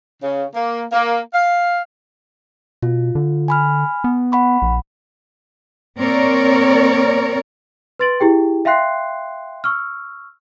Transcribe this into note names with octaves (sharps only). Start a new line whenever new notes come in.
C#3
A#3
A#3
F5
B2 F4
D3
G#5 B5 F6
B3
F#5 B5 C#6
A#1
A#3 C4 A#4 C#5 D5
B4 C6 A6 D7 F#7
E4 G4 G#4 G5
E5 F5 G5 C6 F#6 C7
C#6 E6 F6